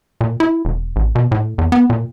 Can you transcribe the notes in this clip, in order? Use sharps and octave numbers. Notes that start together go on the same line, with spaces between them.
A#2
E4
E1
A1
B2
A2
E2
B3
A#2